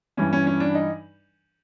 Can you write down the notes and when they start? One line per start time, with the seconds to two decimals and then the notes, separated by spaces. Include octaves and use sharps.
0.17 G2 E3 C#4
0.33 C#4
0.47 C#4
0.60 D4
0.75 D#4